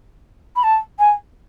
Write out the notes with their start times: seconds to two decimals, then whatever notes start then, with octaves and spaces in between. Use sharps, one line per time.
0.56 B5
0.63 A5
0.99 G#5